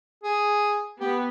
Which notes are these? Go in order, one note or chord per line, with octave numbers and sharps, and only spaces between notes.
G#4
B3 G4